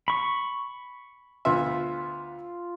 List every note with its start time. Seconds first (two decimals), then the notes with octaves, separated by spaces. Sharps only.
0.08 B5 C#6
1.45 D2 B3 F4 E5